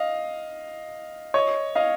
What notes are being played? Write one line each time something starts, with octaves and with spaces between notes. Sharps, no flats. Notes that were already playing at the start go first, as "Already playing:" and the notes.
Already playing: D#5 F5
C#5 D#5
D#5 F5